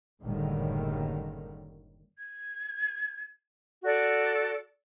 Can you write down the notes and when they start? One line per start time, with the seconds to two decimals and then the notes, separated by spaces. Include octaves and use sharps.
0.23 F#1 A2 D3 D#3 G3 A#3
2.18 G#6
3.84 F#4 A4 D5